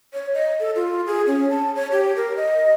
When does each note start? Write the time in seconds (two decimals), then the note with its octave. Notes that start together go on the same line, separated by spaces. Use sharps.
0.13 C#5
0.34 D#5
0.60 A4
0.76 F4
1.07 G#4
1.27 C#4
1.50 A5
1.76 C#5
1.92 G4
2.16 A#4
2.37 D#5